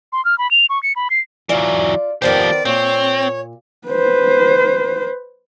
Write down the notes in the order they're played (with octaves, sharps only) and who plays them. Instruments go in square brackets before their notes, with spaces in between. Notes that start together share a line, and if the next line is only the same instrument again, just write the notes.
[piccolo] C6
F6
B5
F7
C#6
C#7
B5
C7
[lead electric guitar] E3 F#3 [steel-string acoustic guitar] F4 D5
[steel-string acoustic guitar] D#3 B3 C5 [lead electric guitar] F3 G4 [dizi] D5
[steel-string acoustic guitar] A#2 [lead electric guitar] C4 [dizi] C#5
[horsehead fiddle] B4 C5